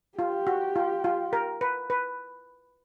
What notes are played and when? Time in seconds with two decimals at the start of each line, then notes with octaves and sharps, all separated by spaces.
0.18 F4 G4
0.47 F#4
0.76 F4
1.04 F4
1.33 A#4
1.61 B4
1.90 B4